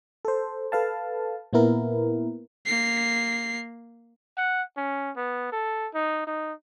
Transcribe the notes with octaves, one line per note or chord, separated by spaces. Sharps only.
A4 C5
A4 B4 F5 A5
A#2 A#3 B3 E4 A#4
A#3 C7
F#5
C#4
B3
A4
D#4
D#4